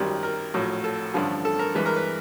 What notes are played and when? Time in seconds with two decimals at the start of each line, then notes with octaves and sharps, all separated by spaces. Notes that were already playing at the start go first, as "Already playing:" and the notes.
Already playing: G#1 F#2 D#3 G3
0.23 A#4
0.54 A#1 A2 F#3
0.84 A4
1.14 A1 G2 D3 F3
1.45 A4
1.59 A#4
1.75 G2 E3 G#3 B4
1.86 A#4
1.96 B4